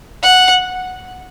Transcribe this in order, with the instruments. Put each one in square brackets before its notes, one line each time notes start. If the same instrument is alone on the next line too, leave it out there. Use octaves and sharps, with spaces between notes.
[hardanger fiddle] F#5